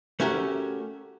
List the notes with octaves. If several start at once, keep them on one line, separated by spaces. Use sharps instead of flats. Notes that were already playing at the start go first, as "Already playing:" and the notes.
A3 C#4 F#4 G4 A#4